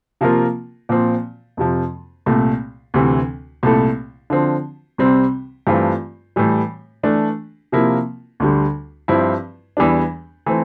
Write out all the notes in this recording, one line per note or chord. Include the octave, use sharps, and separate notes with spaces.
C3 F3 A#3 F4 A#4
A#2 F3 C4
F2 C3 F3
C2 A#2 A3
D2 C3 E3
C2 A#2 A3 E4 A4
D3 F3 C4
C2 C3 G3 C4
G2 E3 A3 C4 F4
A2 E3 G3
E3 A3 D4
C3 F3 A#3 E4 A#4
D2 D3 G3
G2 F3 C4 E4
E2 E3 G3 D4
E3 A3 C4